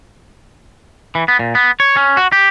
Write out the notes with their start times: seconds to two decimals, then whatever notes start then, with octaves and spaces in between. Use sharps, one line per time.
1.15 E3
1.28 B3
1.39 A#2
1.55 B3
1.80 C#5
1.97 C#4
2.17 F#4
2.32 G4